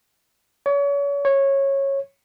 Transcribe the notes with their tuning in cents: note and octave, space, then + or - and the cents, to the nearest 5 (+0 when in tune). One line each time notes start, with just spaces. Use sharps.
C#5 +35
C#5 -15